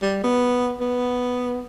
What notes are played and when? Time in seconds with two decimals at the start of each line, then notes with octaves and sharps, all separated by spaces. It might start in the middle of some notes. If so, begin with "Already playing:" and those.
0.02 G3
0.24 B3
0.80 B3